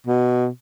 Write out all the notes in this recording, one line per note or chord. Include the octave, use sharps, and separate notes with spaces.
B2